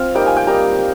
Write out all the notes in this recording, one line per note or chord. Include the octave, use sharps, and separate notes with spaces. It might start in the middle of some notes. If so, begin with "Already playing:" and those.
Already playing: C4 F4 F5
G3 A#3 D#4 G5
G#5
G5
G3 A#3 D#4 A#5